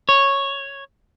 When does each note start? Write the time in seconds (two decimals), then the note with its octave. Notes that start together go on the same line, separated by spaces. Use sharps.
0.09 C#5